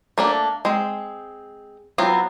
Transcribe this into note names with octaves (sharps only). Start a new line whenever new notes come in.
A3 A#3 D4
G#3 C4
F#3 B3 C4 E4 F4